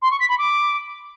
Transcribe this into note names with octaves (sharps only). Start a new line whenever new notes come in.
C6
C#6
B6
B5
D6